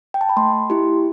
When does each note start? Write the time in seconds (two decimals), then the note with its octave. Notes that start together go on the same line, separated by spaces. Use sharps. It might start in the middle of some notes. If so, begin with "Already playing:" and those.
0.14 G5
0.21 A5
0.29 B5
0.37 A3 C6
0.70 E4 G4